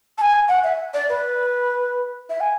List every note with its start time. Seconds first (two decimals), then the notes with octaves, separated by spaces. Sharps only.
0.18 A5
0.21 G#5
0.48 F#5
0.64 E5
0.94 D5
1.09 B4
2.30 E5
2.41 G#5